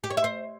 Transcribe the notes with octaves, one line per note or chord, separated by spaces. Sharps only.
G4
C#5
E5
C5